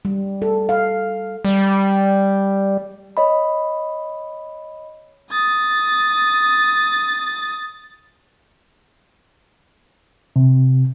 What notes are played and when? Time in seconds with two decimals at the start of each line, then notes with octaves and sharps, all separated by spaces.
0.05 G3
0.42 A4
0.69 F5
1.45 G3
3.17 C#5 D#5 B5
5.31 D#6 A6
10.36 C3